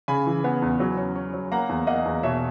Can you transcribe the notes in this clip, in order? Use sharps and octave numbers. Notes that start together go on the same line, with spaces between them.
C#3 G#5 B5
E3
B3
E2
F#3
C#4
C#4
F#3
A#3 F#5 A#5
E2
A#3 D#5 F#5
E2
B2 C#5 E5